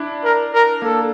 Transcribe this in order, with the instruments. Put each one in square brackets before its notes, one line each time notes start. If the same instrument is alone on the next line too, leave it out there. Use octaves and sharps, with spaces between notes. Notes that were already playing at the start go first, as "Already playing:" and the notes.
Already playing: [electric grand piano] D4 E4
[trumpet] A#4
A#4
[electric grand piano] A#3 [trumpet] A4